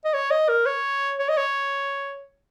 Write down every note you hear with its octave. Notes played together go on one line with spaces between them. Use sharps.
D#5
C#5
D#5
A#4
C#5
C#5
D#5
C#5